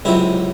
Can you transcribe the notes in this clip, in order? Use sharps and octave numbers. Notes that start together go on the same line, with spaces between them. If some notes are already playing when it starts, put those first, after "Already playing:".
C#2 C3 F#3 E4